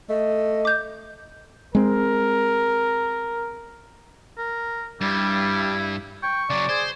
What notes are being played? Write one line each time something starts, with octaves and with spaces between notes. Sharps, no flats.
A3 D#5
D6 G6
G#3 C4 A#4
A#4
G2 G3 E4
G5 C#6
C#3 F#3 D5
G#4 C5